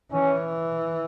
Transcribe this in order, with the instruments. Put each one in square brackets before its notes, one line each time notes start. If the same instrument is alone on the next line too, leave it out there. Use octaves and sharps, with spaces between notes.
[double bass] E3 [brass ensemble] C#4